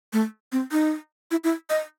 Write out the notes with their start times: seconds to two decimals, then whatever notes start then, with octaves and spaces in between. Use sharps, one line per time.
0.13 A3
0.52 C4
0.72 D#4
1.31 E4
1.44 E4
1.70 D#5